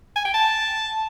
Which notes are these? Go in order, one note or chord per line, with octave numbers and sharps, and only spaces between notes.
G#5
G5
A5